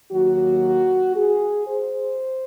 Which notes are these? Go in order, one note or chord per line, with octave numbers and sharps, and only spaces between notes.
D#2 D#3 F#3 A#3 F#4
G#4
C5